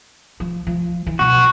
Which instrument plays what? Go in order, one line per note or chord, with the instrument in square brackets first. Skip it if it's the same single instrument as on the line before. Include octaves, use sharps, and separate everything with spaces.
[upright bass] F3
F3
E3
[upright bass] B1 [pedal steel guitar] F#4